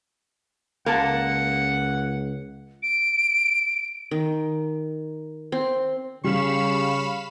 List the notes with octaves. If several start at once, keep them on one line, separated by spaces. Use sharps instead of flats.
C#2 A#3 F#5 A5
D7
D#3
C4
C#3 G3 F5 B5 C#6 E7